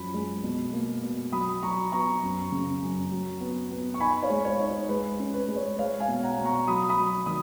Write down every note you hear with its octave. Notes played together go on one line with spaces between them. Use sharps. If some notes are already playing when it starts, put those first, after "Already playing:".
Already playing: F#2 F3 F#3 B5
G#3
B2
A#3
B2
F#3 B5 D#6
F#3 A#5 C#6
B3 A#5 C#6
F#2
C#3
F#2
F#3
B3
B3
C#6
D#4 G#5 B5
C#5 F5
G#3
C#5
D#4
C#5
G#3 B4
C#4
B4
G#3
C#5
G#3 C#5 F5
F5 G#5
B2
F#5 A#5
B2
A#5 C#6
F#3 B5 D#6
B5 D#6
F#3
D#3 D#6